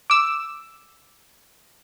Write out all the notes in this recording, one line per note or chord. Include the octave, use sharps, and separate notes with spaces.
D6 E6